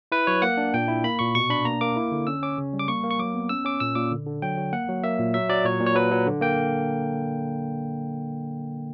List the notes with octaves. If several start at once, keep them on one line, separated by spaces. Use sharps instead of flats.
E4 B4
F#3 C#5
A#3 F#5
D4
A#2 G5
E4
A#3 B5
A#2 C#6
B2 C#6
D4 B5
A#3 A#5
A#3 D6
E4
D3
C#4 E6
C#4 D6
C#3
G3
D6
A#3 C#6
A#3
C#6
F#3 D6
B3
C#4 E6
C#4 D6
A#2 E6
A#2 D6
D3
D3
F#3 G5
F#3
A#3 F#5
F#3
A#3 E5
A#2
F#3 E5
F#3 D5
A#2 C#5
A#2
C#5
F#3 B4
F#3
D3
A#3 G5